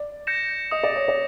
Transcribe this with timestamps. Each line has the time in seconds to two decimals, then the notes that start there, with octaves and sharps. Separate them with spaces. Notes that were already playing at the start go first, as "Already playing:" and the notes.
Already playing: D5
0.27 G6 A#6 C#7 E7
0.71 D#5 D#6
0.84 D5
0.96 C#5
1.08 D5